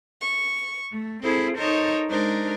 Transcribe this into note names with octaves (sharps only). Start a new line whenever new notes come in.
C#6
A3
C4 E4 G#4 A4 C5
D#4 A4 A#4 C5 C#5 D#5
G#3 D4 D#4 A#4 C5